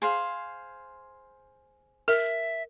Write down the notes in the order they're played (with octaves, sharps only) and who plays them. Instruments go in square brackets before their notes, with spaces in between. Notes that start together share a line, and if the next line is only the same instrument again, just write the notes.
[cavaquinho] G#4 C5 F5
[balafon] A#4 [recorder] E5